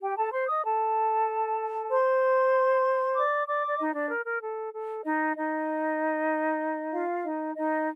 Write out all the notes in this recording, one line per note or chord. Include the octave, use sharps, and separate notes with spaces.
G4 G5
A4 A5
C5 C6
D#5 D#6
A4 A5
C5 C6
D5 D6
D5 D6
D5
D#4 D#5
D4 D5
A#4
A#4
A4
A4
D#4 D#5
D#4 D#5
F4 F5
D#4 D#5
D#4 D#5